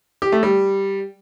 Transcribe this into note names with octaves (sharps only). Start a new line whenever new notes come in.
G4
A3
G3